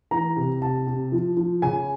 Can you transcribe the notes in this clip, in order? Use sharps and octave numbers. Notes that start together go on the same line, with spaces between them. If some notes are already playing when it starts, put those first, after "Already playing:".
E3 A#5
C3
C3 A5
C3
F3
F3
C#3 G#5